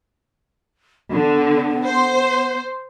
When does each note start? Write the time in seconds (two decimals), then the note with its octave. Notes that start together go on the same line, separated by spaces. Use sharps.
1.12 D3 B3
1.85 C5